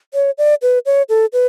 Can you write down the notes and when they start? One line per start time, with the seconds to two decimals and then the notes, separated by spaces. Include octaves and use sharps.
0.14 C#5
0.38 D5
0.62 B4
0.86 C#5
1.09 A4
1.33 B4